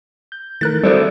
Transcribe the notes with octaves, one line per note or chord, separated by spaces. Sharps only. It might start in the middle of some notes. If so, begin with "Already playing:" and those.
G6
D#3 E3 A3 A#4 F#6 A6
G3 C4 E4 A4 C5 D5